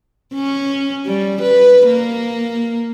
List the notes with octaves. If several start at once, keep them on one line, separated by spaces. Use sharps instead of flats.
C#4
G3
B4
A#3